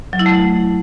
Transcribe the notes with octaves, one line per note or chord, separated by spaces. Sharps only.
F#3
E4
A3